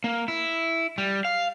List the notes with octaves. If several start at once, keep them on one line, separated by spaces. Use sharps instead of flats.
A#3
E4
G3
F5